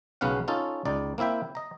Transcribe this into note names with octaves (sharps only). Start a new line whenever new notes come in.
B1 C#3 B3 C#4 F5 F#5
C#4 D#4 F4 A4
C#2 D#4 D5
A#3 C4 E4 E5 G5
D#5 A#5